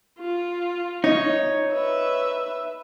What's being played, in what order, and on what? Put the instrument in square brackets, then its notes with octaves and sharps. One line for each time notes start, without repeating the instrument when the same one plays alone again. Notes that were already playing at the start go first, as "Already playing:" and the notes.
[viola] F4
[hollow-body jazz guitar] D#4 [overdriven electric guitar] C#5
[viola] B4 E5